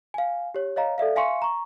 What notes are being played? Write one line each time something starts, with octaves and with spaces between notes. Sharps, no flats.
F5 G#5
G4 C#5
C#5 D#5 F5 A#5
A4 D5 E5 F5
E5 F5 G#5 C6 C#6 C#7
A#5 C#6